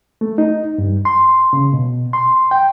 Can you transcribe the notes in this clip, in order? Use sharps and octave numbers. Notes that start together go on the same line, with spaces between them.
A3
D#4
G2
C6
C#3
B2
C6
G5